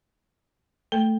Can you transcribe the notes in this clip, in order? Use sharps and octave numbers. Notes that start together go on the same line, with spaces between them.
A3 A4